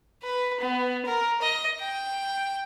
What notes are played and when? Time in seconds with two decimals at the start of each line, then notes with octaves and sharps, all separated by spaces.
0.23 B4
0.60 B3
1.06 A#4
1.42 D#5
1.80 G5